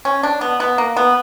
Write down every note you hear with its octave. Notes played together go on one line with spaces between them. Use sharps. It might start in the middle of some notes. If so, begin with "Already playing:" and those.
C#4
D4
B3
B3
A#3
B3